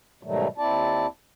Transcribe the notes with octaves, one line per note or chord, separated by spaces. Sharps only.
G#2 B2 D#3 F#3 G3 A3
D#2 C4 E4 D5 A5